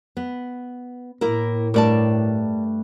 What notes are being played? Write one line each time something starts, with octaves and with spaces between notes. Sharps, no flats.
B3
A2 A#3 E4 A#4
G2 A3 A#4 D5 A5